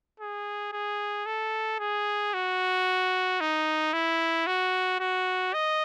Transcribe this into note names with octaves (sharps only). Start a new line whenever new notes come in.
G#4
G#4
A4
G#4
F#4
D#4
E4
F#4
F#4
D#5